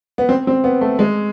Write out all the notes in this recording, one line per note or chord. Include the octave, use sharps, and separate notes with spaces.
B3
C4
C4
B3
A3
G#3